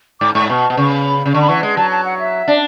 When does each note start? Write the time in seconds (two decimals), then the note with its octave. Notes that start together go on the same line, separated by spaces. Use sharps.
0.20 G#2 D6
0.35 G#2 C#6
0.49 B2 C#6
0.70 B2
0.77 C#3 C#6
0.92 B5
1.26 C#3
1.34 D3 C#6
1.42 B5
1.48 E3 C#6
1.63 G#3
1.77 F#3 A5
1.91 A5
2.05 F#5
2.19 E5
2.48 D4